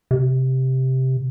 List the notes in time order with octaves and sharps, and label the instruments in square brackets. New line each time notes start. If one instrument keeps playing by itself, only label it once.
[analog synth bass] C3